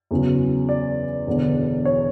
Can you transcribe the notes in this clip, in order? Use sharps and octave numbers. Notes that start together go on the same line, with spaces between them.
E2 C#3 F#3
D5
E1 E2 D3
C#5